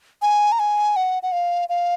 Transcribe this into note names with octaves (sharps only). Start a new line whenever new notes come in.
G#5
A#5
G#5
F#5
F#5
F5
F5